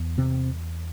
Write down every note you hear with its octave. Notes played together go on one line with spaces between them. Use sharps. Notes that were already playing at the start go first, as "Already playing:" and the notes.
Already playing: E2
C3 C4